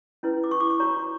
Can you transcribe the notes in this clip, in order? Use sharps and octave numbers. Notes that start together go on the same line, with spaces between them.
C#4 E4 B4
D6
C#6
D6
C#6
F#4 C#5 A#5